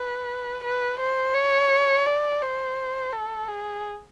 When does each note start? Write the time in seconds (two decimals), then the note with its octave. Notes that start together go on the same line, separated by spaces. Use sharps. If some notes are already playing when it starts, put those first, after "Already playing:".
Already playing: B4
0.64 B4
1.00 C5
1.34 C#5
2.06 D5
2.42 C5
3.13 A4
3.48 G#4